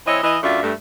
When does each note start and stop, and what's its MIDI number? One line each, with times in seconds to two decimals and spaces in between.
0.07 0.22 52
0.07 0.22 60
0.07 0.22 73
0.07 0.22 75
0.23 0.37 52
0.23 0.37 75
0.43 0.61 42
0.43 0.61 57
0.43 0.61 62
0.43 0.61 65
0.43 0.61 76
0.62 0.73 43
0.62 0.73 57